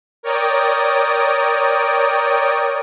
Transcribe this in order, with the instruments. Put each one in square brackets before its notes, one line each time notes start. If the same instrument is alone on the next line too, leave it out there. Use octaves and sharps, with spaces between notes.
[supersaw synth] A#4 C#5 D5 G5 D#6